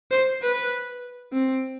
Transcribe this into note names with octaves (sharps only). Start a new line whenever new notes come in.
C5
B4
C4